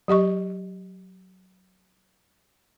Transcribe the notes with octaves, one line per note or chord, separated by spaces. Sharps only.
F#3 G4 D#5 C#6